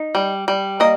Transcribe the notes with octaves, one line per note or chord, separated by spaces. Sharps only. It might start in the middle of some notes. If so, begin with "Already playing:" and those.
Already playing: D#4
G3
G3
A#3 D#5